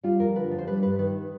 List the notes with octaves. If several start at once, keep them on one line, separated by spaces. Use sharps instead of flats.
G3 F4
F2 A#4
D3 B4
F2
C5
G3 B4
G2 B4
D#3 B4